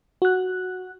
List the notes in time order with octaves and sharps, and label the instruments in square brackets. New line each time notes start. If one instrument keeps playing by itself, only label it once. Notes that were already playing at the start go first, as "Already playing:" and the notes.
[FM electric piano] F#4 F#6